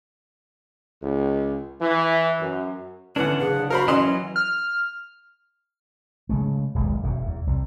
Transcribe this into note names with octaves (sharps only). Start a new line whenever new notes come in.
C#2
E3
F#2
D3 E3 C#4 D4 B4 F#5
F#1 G#4
F#4 A#4 C5 B5
E3 F#3 C#4 D#5 C6
F6
C#3 G#3 A3
D#1 B1 G#3
E1 F#2
E2
C2